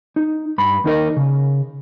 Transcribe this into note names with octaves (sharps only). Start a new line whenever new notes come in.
D#4
G2 B5
D#2 D#4 A#4 D#5
C#3